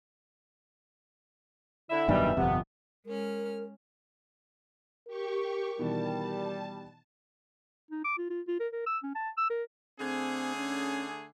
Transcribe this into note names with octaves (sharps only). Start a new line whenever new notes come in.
D3 E4 E5
F1 B1 G2 D#3 G3 B4 D#5
G1 F2 C3 B3
G#3 C#4 A#4 F6
G4 A#4 C#6
B2 D#3 E3 G3 A5
D#4
D6
F4
F4
F4
A#4
A#4
E6
C#4
A5
E6
A#4
D3 A3 C4 G#4
C#4